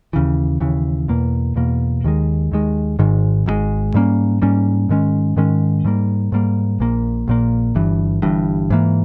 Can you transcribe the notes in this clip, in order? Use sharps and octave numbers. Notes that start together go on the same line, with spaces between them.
D#2 C#3 E3
D#2 C#3 E3
E2 B2 A#3
E2 B2 A#3
D#2 D#3 G#3
D#2 D#3 G#3
G#1 G#2 D#3 G#3
G#1 G#2 D#3 G#3
G#2 G3 A#3 C#4
G#2 G3 A#3 C#4
G#2 D#3 G#3 C#4
G#2 D#3 G#3 C#4
G#2 G3 A#3
G#2 G3 A#3
A#1 A#2 A#3
A#1 A#2 A#3
G1 G2 E3
G1 G2 E3
G#2 E3 A#3